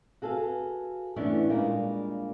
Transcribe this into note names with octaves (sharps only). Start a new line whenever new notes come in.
F#4 G#4 A4 B4 F5
E3 A3 B3 C#4 D4 E4
A#2 G3 G#3 A#3 D4